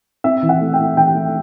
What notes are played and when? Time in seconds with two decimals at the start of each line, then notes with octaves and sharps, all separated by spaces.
0.24 C4 E5
0.42 E3
0.49 F#5
0.60 A3
0.73 G5
0.79 A3
0.97 E3 G5
1.15 A3